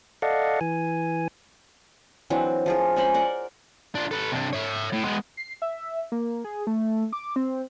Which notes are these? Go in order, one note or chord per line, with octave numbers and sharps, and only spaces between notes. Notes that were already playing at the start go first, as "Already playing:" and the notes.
A4 D5 D#5 F5 F#5
E3 G#5
E3 F#3 C4 D4
F3 F4 G#4
G#3 C#4 C5 B5
A#4 D5 F#5
D4 F4
A4 B4
C3 D4
C#5 E5
A2
G#3 B3
C7
E5
A#3
G#4
A3
D6
C4